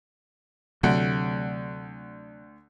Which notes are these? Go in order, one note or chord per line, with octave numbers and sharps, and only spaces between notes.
D2 C3 F#3 A3 F#5